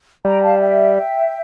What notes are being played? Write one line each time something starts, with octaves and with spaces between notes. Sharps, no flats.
G3 G5 A#5
F5 A5
E5 G5